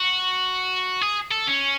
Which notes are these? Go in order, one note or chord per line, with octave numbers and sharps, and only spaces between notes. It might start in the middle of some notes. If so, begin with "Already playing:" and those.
Already playing: F#4
G#4
A4
C#4